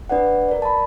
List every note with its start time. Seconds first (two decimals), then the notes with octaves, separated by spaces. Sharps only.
0.09 D4 B4 D5 F#5
0.48 A#4 D5
0.62 A5 B5